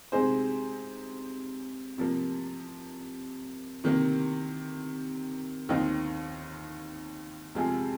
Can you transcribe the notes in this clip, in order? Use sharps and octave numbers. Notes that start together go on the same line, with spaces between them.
C3 G#3 D#4 G#4 C5
C3 F3 A#3
C3 D#3 A#3
D#2 D#3 C4 D#4
F2 C3 G#3 F4 G#4